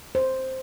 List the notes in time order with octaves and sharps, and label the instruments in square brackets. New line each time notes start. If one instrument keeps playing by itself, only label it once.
[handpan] C5